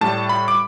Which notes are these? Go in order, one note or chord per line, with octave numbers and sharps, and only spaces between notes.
A2 G3 A5
B5
D6